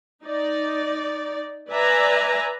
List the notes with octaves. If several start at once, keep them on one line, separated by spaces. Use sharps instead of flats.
D#4 D5
B4 D5 E5 G#5 A#5